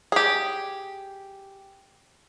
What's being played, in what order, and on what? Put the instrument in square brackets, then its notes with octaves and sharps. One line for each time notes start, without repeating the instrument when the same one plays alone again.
[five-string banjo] G4 G#4